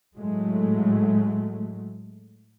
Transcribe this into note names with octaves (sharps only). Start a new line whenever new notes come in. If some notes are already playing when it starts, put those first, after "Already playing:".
A2 F#3 G#3 A3